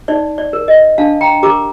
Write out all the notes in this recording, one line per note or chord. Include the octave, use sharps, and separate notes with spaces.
D#4 D5
D5
A#4
D#5
D4 F5 A5
G5 A#5
G4 A#4 A#5 D6